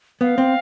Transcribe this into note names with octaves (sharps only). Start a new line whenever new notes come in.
B3 F5
C4